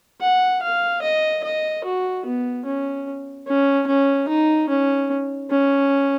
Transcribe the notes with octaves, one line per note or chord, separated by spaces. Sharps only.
F#5
F5
D#5
D#5
F#4
B3
C#4
C#4
C#4
D#4
C#4
C#4